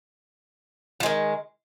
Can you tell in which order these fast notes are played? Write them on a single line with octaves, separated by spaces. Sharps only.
F3 G#3 D#3